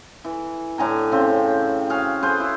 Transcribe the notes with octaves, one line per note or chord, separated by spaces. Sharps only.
E3
A2 D3 G#5 A#5
C#3 C4
F#4 G#4 F5
G#4 B4 C5 F#5
E4